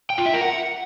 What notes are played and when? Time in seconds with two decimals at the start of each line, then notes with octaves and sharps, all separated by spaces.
0.10 G5
0.18 F4
0.26 E5
0.34 A#4
0.41 F#5